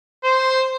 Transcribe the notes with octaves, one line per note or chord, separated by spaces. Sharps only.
C5